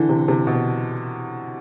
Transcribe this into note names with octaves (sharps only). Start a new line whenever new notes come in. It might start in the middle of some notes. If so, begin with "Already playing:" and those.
Already playing: D3 E3
C3
C3
B2